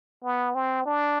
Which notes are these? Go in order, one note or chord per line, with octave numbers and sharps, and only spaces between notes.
B3
C4
D4